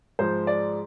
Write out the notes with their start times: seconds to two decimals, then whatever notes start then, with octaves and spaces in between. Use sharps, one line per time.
0.19 G#2 F3 G#3 C5
0.47 D5